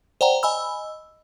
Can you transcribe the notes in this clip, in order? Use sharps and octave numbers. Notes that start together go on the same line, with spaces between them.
C5 D5 F#5 G5 A#5
D#5 G#5 B5 E6